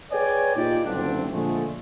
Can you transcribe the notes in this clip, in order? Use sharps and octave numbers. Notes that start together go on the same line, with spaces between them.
G#4 B4 C#5 D5 G5 G#5
A#2 D#4 F4 G4 D5
F#1 D2 G2 C4 D4
A#2 D3 F3 G#3 A3